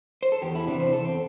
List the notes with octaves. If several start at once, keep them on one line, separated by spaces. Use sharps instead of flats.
C5
A4
E2 G4
E4
C3 E3 D4
C5
E2 A4
C4